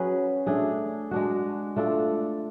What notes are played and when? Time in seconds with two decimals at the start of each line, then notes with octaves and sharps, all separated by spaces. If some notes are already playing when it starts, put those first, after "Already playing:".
Already playing: F#3 C#4 G#4 B4
0.46 A3 D4 G#4
1.11 G#3 D4 F#4
1.76 A3 D4 F4 A4